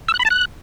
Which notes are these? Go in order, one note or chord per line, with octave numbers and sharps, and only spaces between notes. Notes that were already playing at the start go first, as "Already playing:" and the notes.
E6
F#6
B5
A5
F#6